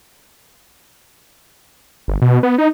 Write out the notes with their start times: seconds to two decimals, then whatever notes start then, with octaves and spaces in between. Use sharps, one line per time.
2.08 G1
2.22 B2
2.43 B3
2.58 D#4